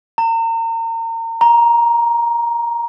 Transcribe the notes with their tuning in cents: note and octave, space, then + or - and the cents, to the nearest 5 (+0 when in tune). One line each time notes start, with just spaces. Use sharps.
A#5 -35
A#5 +10